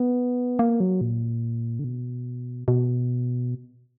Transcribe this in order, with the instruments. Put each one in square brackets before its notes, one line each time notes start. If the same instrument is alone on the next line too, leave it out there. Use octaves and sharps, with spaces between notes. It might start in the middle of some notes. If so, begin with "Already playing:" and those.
Already playing: [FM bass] B3
A#3
F#3
A#2
D3
B2
B2